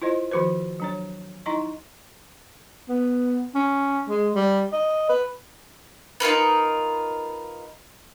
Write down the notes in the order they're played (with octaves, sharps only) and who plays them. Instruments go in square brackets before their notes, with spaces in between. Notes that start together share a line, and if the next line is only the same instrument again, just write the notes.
[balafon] E4 F4 C5 D#5
D#3 F3 F#4 B4 C5
F#3 D4 C#5
D#4 E4 D#5 A#5 C6 C#6
[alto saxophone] B3
C#4
G#3
G3
D#5
B4
[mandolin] D#4 F4 A#4 B4